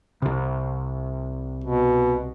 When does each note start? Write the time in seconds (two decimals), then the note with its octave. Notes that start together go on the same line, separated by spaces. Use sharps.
0.22 C2 C3
1.64 B2